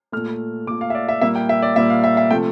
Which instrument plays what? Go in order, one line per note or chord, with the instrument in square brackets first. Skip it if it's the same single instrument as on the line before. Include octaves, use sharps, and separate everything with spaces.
[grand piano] A#2 A3 F6
A#2 D6
A3
F5
E5
D5
E5
A#2 G3 A#3 E5
G5
E5
D5
A#2 G3 A#3 E5
F5
E5
E5
C3 F3 A3 G5